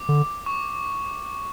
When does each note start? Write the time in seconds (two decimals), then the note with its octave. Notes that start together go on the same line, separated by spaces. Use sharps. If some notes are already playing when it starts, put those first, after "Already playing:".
Already playing: D6
0.09 D3
0.46 C#6